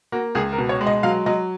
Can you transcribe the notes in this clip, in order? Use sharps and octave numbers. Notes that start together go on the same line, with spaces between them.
A#3 F#4
C#2 G#4
A#4
B2
C#5
G#3
D#5
F#3 F5
F#3 D#5